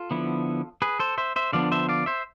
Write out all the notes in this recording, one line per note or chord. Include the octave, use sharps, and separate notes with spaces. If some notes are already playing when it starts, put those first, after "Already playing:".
Already playing: F4 A4
D3 F3 B3 E4
G#4 B4
A4 C5
C5 E5
C5 E5
D3 F3 B3 D4 D5 F5
C5 E5
D5 F5
C5 E5